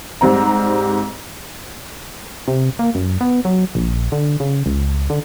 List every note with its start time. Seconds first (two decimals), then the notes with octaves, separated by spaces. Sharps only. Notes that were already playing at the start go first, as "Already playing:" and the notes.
0.21 G#2 G3 C4 A#5
2.48 C3
2.79 A#3
2.95 F#2
3.21 B3
3.45 F#3
3.75 A#1
4.12 D3
4.40 C#3
4.66 C#2
5.10 D3